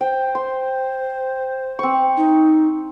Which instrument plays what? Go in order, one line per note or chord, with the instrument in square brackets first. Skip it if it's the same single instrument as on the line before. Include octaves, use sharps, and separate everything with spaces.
[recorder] C5 [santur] G5
[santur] C6
C4 C#6
[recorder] D#4